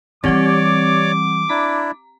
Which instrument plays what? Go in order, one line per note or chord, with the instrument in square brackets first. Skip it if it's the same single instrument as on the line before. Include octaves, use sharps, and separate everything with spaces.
[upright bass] E3 G3 [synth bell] C4 G4 F#5 [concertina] C#5 D5 [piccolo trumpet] D6
[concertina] D4 E4 [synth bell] A#5